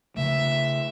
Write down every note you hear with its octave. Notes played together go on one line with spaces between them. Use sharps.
C#3 A3 E5